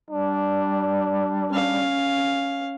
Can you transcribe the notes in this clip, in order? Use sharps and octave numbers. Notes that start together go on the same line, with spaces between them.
G3 D4
C#4 F5